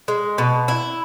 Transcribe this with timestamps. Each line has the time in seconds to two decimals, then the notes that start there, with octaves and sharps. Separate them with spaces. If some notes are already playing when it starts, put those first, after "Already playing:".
0.08 G#3
0.38 B2
0.68 E4